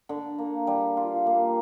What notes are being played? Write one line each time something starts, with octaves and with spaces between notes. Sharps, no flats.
D3
A#3
G3
F4
A#3